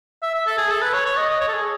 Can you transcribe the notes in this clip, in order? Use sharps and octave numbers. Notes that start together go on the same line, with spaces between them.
E5
E5
A4
G#4
A4
B4
C#5
C#5
D#5
D#5
C#5
A4
G#4